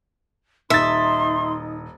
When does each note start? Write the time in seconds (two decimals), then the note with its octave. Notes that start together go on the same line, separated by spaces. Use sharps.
0.70 D#1 D#4 E5 C6 A6